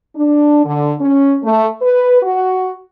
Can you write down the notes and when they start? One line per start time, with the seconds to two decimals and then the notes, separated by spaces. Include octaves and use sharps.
0.15 D4
0.65 D3
0.99 C#4
1.43 A3
1.82 B4
2.23 F#4